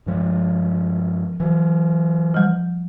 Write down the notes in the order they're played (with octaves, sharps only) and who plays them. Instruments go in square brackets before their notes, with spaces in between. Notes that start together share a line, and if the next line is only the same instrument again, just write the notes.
[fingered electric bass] G2 F3 G#3
E3 F#3
[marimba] F3 G3